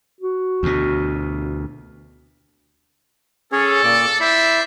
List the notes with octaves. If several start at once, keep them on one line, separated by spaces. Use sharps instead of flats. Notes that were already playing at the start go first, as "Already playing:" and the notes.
F#4
D2 B2
C#4 G#4 A4 C#5
A#2 D5 D6
E4 C5 D5 E5